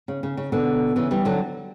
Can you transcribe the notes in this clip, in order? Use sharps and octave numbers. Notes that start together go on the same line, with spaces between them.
C#3
C#3
C#3
B2 D3
C#3 E3
E3 G3
D3 F#3